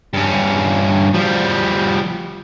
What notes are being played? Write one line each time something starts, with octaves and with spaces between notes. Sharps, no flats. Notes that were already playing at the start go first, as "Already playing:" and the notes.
G2 C#4
F3 G3